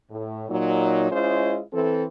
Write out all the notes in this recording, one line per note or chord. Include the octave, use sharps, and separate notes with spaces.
A2
A#2 F#3 D#4
G#3 C#4 E4 F4 C5 D#5
E3 C4 A4